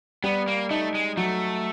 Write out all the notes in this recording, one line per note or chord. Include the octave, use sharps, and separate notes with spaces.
G3 B3
A#3
A3 D#4
G#3
F#3 A3